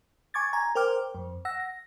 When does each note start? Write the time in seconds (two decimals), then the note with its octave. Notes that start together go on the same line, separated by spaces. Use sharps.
0.34 G#5 C#6 D6 G#6 A6
0.53 G#5 A#5 G#6
0.75 A#4 C5 G5 D6 F6
1.15 F2
1.45 F#5 E6 A#6
1.60 A#6